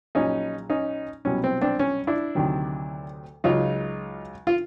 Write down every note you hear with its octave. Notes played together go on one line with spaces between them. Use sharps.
A#1 A#2 F#3 C#4 D#4
C#4 D#4
C2 B2 F#3 C#4
C4
C4 D4
C#4
D4 E4
D2 C3 D#3 F#3
C#2 C#3 F#3 D#4 F4
F4